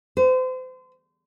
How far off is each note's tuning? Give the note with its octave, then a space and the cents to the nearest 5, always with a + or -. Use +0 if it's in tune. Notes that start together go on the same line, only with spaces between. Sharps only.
C5 -35